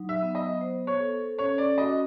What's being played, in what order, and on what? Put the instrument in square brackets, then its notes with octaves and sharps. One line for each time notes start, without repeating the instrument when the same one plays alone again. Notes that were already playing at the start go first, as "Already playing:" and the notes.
Already playing: [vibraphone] F#3 D#4
[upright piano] E5
[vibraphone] B3
[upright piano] D#5
[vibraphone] C5
[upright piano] C#5
[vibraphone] A4
[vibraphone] C#4 [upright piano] C#5
[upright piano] D5
[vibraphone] F#4 [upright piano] D#5